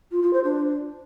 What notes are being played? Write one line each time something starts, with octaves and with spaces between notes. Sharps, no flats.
F4
F4
C5
D4